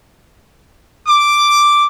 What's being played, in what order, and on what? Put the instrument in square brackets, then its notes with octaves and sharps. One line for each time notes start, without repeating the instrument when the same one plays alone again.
[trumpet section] D6